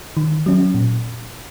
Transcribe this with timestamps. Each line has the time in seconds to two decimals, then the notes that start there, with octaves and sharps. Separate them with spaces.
0.17 D#3
0.46 F#3 C#4
0.74 A#2